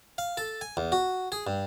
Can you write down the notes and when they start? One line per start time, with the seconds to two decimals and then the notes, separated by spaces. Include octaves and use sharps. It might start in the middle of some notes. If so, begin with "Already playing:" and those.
0.18 F5
0.37 A4
0.61 G#5
0.77 E2
0.92 F#4
1.32 G#4
1.47 G2